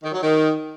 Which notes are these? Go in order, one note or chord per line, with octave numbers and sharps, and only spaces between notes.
D#3
F#3
D#3